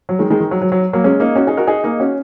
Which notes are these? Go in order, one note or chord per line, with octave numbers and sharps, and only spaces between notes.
F#3
D#3 G#3
D#3 G#3
D#3
F#3
F#3
F#3
F#3 A#3
G#3 C#4
A#3 D#4
C#4 F#4
D#4 G#4
F#4 A#4
D#4 G#4
A#3 D#4
C#4 F#4